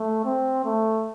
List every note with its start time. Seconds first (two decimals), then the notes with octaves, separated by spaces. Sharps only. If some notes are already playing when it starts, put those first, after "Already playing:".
Already playing: A3
0.25 C4
0.65 A3